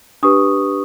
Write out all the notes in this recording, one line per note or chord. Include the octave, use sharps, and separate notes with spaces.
D4 G4 B4 C#6 D#6